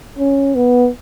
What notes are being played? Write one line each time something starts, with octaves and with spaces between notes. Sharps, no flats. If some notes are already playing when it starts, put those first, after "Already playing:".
C#4
B3